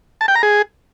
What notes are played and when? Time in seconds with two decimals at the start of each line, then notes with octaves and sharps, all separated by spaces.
0.21 A5
0.28 G5
0.36 A#5
0.43 G#4